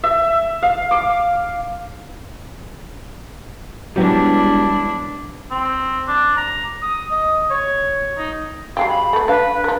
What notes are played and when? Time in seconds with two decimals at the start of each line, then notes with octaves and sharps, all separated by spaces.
0.04 E5
0.63 F5
0.91 D6
3.96 E1 E3 F#3 G3 D4 E4 G4
5.51 C4
6.08 D4
6.37 A#5
6.83 D#6
7.11 D#5
7.51 C#5
8.18 D#4
8.77 F#3 G#3 G4 F5
8.89 B5
9.13 A3 B3
9.28 D4 B4 F5
9.64 F3 A#4